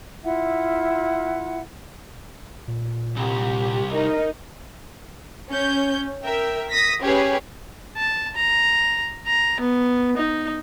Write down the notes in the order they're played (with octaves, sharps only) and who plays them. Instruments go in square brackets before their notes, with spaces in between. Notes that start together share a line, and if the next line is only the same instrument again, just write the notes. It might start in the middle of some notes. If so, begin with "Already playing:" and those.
[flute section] E4 F4 E5 F#5
[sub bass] A#2
[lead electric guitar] C2 [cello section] G4
[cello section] D#4 [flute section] A#4
[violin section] C#4 G6
A#4 E5 G5
D#6 A#6 B6
C#4 G4 G#4 B4 C#5
[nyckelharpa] A5
A#5
A#5
B3
D#4